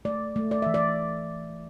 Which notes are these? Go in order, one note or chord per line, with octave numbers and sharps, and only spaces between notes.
A3 D5
A3
D5
E3 E5
D5